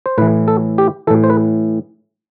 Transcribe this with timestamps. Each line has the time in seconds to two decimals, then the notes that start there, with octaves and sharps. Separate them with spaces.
0.06 C5
0.18 A2 E3 B4
0.48 A4
0.78 G4
1.07 E3 A4
1.10 A2
1.24 C5
1.30 B4